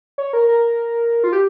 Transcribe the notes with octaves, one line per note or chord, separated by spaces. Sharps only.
C#5
A#4
A#4
F4
G4